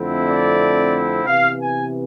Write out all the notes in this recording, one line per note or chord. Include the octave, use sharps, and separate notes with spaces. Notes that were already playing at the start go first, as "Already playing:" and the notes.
Already playing: F2 D3 A3 C4 E4
D5
C3 E3 B3 F5
G#5